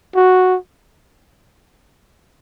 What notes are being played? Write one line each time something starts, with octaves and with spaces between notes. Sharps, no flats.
F#4